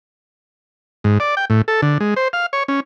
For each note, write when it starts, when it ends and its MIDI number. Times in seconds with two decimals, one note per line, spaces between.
1.04 1.18 44
1.20 1.35 74
1.37 1.45 79
1.50 1.61 45
1.68 1.81 69
1.82 1.98 50
2.00 2.14 56
2.16 2.28 72
2.33 2.46 77
2.53 2.63 73
2.68 2.80 61